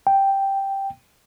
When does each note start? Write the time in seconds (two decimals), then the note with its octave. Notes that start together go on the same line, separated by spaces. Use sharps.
0.07 G5